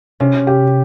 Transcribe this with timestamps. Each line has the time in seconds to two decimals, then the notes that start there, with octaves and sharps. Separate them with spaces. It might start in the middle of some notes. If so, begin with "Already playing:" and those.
0.20 C3 C#4
0.47 G4